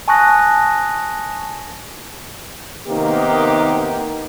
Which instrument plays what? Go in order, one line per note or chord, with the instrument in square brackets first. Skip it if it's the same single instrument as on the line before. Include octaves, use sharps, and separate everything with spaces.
[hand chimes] G#5 A5 C#6 D#6 F#6 A#6
[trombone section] C3 D#3 A#3 B3 D#4 G4